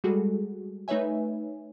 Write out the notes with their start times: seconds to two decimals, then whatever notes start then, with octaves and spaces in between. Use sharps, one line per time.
0.04 G3 G#3 F#4 G#4 A4
0.88 A3 D#4 B4 C#5 E5 G#5